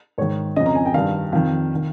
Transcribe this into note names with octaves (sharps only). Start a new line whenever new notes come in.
G#2 D#3 C#5
F2 C#3 D#5
A#5
G#5
G5
G2 D#3 F5
F2 D#3 F5
D#3